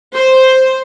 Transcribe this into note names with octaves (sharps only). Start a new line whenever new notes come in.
C5